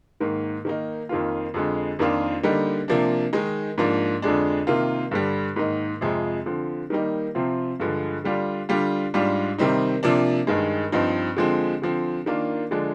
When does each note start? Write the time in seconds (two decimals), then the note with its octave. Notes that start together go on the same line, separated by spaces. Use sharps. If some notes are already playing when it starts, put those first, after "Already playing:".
0.20 G#2 D#3 A#3
0.65 D#3 A#3 D#4
1.09 F2 D#3 A#3 F4
1.54 F2 D3 G#3
1.99 F2 D#3 A#3 D4 F4
2.43 D3 G3 A#3 D#4
2.88 C3 F3 A#3 D4
3.33 D#3 G#3 D#4
3.78 G#2 F3 A#3 D4
4.22 F2 D3 G#3 D4
4.67 C3 D#3 A#3 F4
5.11 G2 D3 G3
5.56 G#2 D#3 A#3 D#4
6.01 F2 C3 F3 G#3
6.46 D3 F3 C4
6.90 D#3 G3 A#3 D#4
7.35 C3 F3 C4 F4
7.80 G2 D3 F3 G#3
8.24 D3 G3 D4 F4
8.69 D3 G3 D4 F4
9.14 G#2 G3 D4 F4
9.58 C3 D#3 G3 C4 D#4
10.03 C3 F3 A#3 D4
10.47 G2 D#3 G#3
10.92 G2 F3 C4 D#4
11.36 D3 F3 G#3 C4
11.82 D3 F3 C4
12.26 D#3 A#3 D4 F4
12.71 D3 F3 G#3 D4